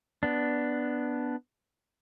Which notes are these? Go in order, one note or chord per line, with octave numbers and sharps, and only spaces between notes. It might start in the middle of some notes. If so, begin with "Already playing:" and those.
B3 D4